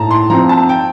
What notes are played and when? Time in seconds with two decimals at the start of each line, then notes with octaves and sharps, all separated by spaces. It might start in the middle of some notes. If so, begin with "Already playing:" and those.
Already playing: A2 A5 A#5
0.11 C6
0.30 F3 A#5
0.33 C4
0.49 A5
0.69 G5